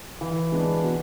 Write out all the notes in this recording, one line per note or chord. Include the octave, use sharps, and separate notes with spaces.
E3
G#3 B3 D4
B2